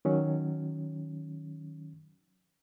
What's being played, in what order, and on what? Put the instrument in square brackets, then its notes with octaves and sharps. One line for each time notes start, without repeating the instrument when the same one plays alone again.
[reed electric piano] D#3 F#3 C#4